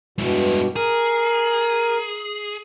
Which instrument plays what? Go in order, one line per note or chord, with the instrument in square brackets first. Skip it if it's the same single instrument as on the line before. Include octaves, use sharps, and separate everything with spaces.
[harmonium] G2 B2 [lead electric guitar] G#3 E4
[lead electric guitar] G#4 [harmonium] A#4